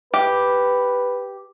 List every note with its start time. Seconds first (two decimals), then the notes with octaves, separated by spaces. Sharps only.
0.14 G4 B4